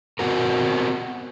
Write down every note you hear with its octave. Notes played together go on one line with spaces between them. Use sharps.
B3 C4 F#4 A#4